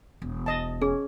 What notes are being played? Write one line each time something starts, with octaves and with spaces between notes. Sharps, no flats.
E1
D#5 A5
C#4 G#4